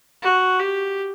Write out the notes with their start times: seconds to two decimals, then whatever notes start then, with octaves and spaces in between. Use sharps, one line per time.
0.22 F#4
0.60 G4